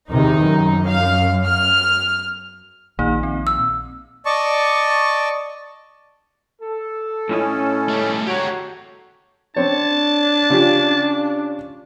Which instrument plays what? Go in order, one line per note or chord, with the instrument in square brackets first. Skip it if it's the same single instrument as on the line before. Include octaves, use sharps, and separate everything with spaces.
[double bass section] E2 C3 D#3 [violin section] D#4
[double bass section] F#2
[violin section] F5
F6
[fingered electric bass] A#1 [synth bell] D#3 A#3 D#4
[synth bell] C4
[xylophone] E6
[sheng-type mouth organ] D5 D#5 A5 C#6
[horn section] A4
[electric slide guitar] A2 E4 D#5 [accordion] C#4
[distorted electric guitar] G3 A3
[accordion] F#4 C#5 [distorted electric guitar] G4 A#5
[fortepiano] C4 C#5 [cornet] D4 [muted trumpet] A5
[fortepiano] C#3 F4 G4